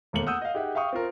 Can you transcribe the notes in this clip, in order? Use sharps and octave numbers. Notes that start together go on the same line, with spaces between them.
E1 D#2 A3 A#3 C#7 F#7
F#5 D#6 E6 G6 D#7
D#5 F5
D#4 G4 G#4 E5 F#5
E5 F5 G5 C#6 D#6
C4 F4 A#4